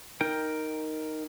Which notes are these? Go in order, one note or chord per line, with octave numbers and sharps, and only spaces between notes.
D#4 A#4 G5